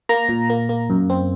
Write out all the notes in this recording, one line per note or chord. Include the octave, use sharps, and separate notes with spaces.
A#3 A#5
A#2
A#3
A#3
F#2
C4